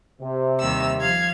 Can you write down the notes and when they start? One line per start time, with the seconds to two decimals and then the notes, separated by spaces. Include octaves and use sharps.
0.21 C3
0.59 D#2 G3 E6
0.98 F3 F5 G#6